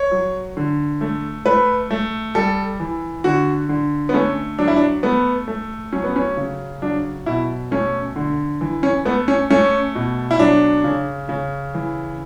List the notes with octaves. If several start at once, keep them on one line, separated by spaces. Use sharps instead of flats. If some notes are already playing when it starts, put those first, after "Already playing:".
Already playing: C#5
F#3
D3
A3
A3 B4
A3
G3 A4
E3
D3 F#4
D3
B3
A3 C#4
F#3 D4
E4
D4
A3 B3
A3
F#3 C#4
B3
C#4
C#3
F#3 D4
B2 E4
A3 C#4
D3
E3
C#4
A3 B3
C#4
A3 C#4
B2
E4
F#3 D4
C#3
C#3
E3